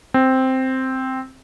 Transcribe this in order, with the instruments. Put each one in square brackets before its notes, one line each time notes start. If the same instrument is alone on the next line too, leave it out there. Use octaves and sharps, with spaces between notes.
[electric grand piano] C4